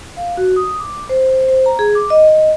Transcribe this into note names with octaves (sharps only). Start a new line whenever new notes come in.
F5
F#4
D#6
D6
C5
C5
A#5
G#4
D6
D#5
D#5